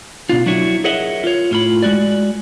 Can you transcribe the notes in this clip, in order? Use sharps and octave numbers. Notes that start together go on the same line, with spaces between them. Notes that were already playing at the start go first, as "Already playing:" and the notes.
B2 D4 F4
F#3 D4 E4 F#4 C#5
G#4 A#4 C#5 D#5 E5 F#5
F4 C#5
A2 F4 B5
G#3 F#4 D5